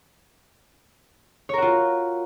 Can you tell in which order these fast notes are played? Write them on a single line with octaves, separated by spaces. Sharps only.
C#5 A#4 F#4 F4